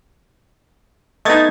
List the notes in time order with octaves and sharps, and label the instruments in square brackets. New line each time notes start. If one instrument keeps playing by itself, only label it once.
[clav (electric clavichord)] A3 B3 D#4 [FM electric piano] D#5 G#6 A6